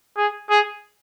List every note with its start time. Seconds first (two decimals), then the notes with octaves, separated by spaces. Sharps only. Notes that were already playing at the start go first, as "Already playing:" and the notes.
0.17 G#4
0.50 G#4